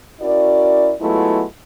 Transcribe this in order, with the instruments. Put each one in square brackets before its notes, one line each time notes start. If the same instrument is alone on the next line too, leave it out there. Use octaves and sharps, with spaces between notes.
[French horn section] C#4 E4 F#4 A#4 D5
F#3 G#3 A3 B3 E4 F4